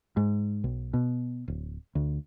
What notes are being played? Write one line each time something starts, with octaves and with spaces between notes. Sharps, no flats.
G#2
B1
B2
D1
D2